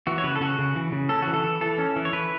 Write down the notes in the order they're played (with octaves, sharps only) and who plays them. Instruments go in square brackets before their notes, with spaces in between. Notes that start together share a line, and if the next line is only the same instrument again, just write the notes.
[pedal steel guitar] E3 F#4
C#5
C#3 B4
A4
C#3 F#4
C#3
E3
C#3
C#4 A4
E3 F#4
A4
E3
E3 A4
C#4
E3
C#5
E3 B4